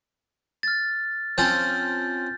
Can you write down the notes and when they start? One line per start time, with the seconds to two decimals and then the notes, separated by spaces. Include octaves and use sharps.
0.63 F6 A6
1.38 F3 C4 C#4 G6 A6